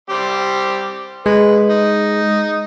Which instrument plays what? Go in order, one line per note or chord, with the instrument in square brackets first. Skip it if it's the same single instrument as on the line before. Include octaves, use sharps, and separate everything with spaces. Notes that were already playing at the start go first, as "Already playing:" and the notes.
[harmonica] G3 C4 G4
[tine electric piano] G#3 [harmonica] B4
[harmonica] D#4